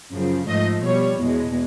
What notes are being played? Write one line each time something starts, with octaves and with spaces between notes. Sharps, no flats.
F#2 C#3 F3
G#2 F3 A3 D#5
B2 G3 C#5
E2 B2 G#3